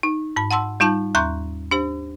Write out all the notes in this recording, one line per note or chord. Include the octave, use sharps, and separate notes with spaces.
D#4
G#2 B5
F#5 A5 C6 E6
G3 D#4 F4 A5 G6
D#2 A#5 C6 C#6 G6
D4 G4 C5